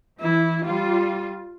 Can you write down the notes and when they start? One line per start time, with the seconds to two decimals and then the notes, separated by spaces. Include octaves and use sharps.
0.21 E3 E4
0.66 G3 F4